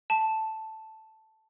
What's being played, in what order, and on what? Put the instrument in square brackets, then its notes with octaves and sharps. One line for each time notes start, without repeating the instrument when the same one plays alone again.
[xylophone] A5